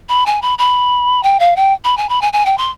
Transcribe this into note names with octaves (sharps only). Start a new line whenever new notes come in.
B5
G#5
B5
B5
G5
F5
G5
B5
G#5
B5
G#5
G#5
G5
C6